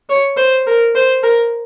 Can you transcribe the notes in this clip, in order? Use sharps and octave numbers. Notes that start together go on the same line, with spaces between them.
C#5
C5
A#4
C5
A#4